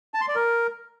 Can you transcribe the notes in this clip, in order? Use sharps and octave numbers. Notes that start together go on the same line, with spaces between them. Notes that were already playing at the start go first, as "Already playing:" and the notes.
A5
C6
D5
A#4